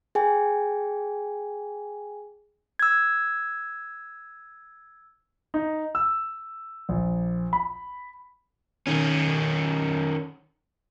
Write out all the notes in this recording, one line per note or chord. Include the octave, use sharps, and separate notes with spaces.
G#4 G5 G#5
E6 G#6
D#4
E6
A#1
B5
D#3 C#4